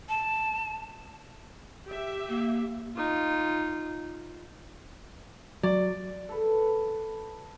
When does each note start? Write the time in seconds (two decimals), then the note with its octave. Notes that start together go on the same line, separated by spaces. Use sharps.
0.09 A5
1.89 G4 E5
2.28 A#3
2.96 D#4 F4
5.63 F#3 D5
6.29 A4 B4